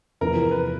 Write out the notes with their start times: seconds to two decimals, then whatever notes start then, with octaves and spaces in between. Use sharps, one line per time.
0.21 E2 C3 F3 A#4
0.51 B4